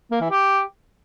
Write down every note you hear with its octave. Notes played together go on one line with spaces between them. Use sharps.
A#3
E3
G4